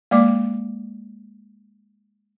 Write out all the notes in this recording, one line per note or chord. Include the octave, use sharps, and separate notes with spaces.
G#3 A#3 D5 D6